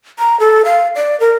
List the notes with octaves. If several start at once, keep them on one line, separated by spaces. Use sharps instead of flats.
A#5
A4
F5
D5
A#4